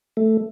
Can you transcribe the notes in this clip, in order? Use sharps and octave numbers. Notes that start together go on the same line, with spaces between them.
A3